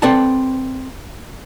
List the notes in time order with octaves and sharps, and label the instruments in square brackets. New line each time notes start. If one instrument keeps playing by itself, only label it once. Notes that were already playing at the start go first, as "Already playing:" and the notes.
[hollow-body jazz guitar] C4 A4 B4 D5 F#5 A5